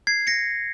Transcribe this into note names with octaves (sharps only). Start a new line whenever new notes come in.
G#6 C7
A#6 C#7